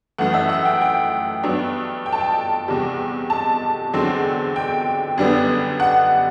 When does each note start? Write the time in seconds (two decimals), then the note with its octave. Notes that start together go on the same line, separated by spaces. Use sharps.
0.18 F#2 E3 A3 F#5
0.34 E5
0.49 F#5
0.65 G5
0.82 G5
1.43 G2 F#3 B3 D4
2.06 G5
2.13 A5
2.21 G5
2.68 E2 C3 G3
3.30 A5
3.93 E2 D3 F#3 C4
4.56 G5
5.18 F#2 D3 G3 B3 D4
5.80 F#5